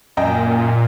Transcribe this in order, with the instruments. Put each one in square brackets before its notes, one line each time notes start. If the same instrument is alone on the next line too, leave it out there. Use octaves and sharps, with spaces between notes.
[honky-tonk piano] F#2 D#5 G5 [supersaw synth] A#2